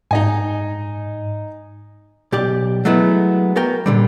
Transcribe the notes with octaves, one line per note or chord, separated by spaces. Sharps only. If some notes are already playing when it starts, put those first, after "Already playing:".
G#2 D#4 D#5 G#5
B1 G4 D5
F#3 G#3 A3 B3 E4
B3 F#4 A#4 G5
A#2 D3 G3